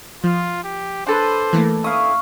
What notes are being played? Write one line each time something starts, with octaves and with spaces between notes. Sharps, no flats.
F3 F4
G4
D4 A4 B4 C5
E3 A3 A#3
E4 F5 C#6 D#6